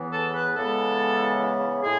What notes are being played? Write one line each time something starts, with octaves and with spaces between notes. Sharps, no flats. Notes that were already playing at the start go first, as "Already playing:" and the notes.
Already playing: E2 C#3 E3 B3
A4
B4
C#3 E3 G#3 B3 A4
A2 G#3 G#4